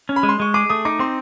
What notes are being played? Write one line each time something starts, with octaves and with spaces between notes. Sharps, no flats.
C#4
B5
G#3
C6
G#3 C#6
G#4 D6
A3 D#6
D#4 D6
C4 C6